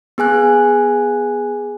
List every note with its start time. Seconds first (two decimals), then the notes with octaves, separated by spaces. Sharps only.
0.18 B3 G#4 G#5 F#6